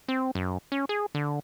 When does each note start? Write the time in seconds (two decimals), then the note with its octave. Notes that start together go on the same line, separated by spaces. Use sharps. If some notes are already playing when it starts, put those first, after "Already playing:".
0.08 C4
0.35 F#2
0.72 C#4
0.89 G#4
1.15 D3